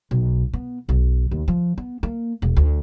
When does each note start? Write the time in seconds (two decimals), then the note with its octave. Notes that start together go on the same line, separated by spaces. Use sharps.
0.11 B1
0.53 B3
0.89 B1
1.31 D#2
1.48 F3
1.78 B3
2.03 A#3
2.42 E1
2.57 D2